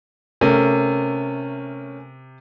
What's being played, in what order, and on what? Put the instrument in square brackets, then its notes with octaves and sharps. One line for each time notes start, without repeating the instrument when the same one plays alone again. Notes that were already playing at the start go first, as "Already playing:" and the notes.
[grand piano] C3 [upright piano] A3 C#4 A#4